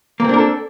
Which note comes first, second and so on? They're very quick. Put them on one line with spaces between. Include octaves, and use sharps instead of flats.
A#3 C4 D4 A#4 A4